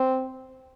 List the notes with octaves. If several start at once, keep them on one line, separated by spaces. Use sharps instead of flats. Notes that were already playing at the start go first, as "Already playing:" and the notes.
Already playing: C4